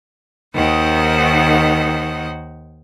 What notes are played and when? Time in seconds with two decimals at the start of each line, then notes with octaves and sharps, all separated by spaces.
0.54 D#2 D#3 C5 D#5 F#5